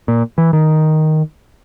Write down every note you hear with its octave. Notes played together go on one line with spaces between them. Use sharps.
A#2
E3
D#3